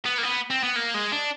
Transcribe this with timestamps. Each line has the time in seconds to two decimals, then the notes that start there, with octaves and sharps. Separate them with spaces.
0.05 B3
0.18 A#3
0.23 B3
0.50 C4
0.63 B3
0.76 A#3
0.94 G#3
1.12 D4